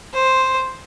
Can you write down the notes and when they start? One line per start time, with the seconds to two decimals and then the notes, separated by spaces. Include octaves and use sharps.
0.14 C5